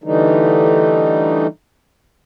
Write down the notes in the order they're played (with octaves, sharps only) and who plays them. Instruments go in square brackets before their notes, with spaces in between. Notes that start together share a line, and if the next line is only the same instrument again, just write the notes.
[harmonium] D3 E3 G3 A3 D#4